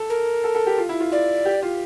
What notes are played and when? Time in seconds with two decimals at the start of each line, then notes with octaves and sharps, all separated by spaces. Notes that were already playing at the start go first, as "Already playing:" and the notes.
Already playing: A4
0.10 A#4
0.44 A4
0.55 A4
0.67 G4
0.78 F4
0.89 E4
1.00 F4
1.12 F4 D5
1.45 G4
1.63 F4